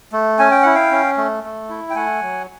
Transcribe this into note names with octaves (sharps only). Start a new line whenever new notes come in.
A3
C#4 G#5
G5
E4 F#5
F5 G5
C#4
A3
A3
E4
G5
A3 F#5 G#5
F#3